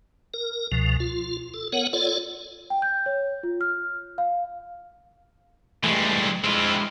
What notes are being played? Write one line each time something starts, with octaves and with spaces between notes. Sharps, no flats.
A#4
C#2 B2 F3
F4
A4
B3 A#4 C#5 F#5
F4 A4 C#5 D5
G5
G6
C#5
F4
F6
F5
A2 E3 G3 G#3
G#3 C4 E4 F4